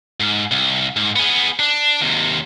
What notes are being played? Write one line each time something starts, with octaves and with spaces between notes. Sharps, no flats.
G#2
C2
G#2
B3 G#4
D4
D#2 C3